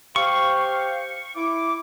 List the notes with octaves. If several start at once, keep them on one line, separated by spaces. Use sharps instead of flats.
G4 C5 F5 C#6
E4 D6